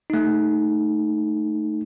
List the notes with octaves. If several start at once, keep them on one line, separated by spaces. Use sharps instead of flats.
A3 D#4